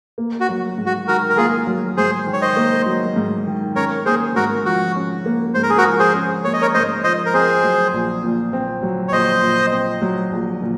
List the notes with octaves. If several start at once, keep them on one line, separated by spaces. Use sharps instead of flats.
A#3
F#4
F#3
G#2
F#4
D#3 F#4 A#4
A#4
A#3 F4 G#4
F#3
G#2 G#4 C5
D#3
C#5
C5 D#5
A#3
F#3
G#2
D#3
C#4 A#4 C#5
A#3 G#4 C5
G#2 F#4 A#4
F3 F#4
C#4
A#3
G#2 C5
A#4
G#4
F#4 A#4
F3
G#4 C5
C#4
A#3 C#5
D#5
A#4 C#5
G#2 C5 D#5
F3 C5 D#5
A#4
C4 G#4 C5
F#3
A#1
A#2
C4
F#3
C#5
A#1 C5 D#5
A#2
C4
F#3
A#1
A#2